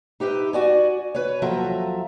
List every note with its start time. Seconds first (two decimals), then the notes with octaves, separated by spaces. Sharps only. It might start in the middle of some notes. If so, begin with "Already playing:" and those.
0.20 D#4 G4 B4 E5
0.53 F#4 D5 G#5
1.15 B4 C#5
1.42 D#2 F3 F#3 A4 E5 A#5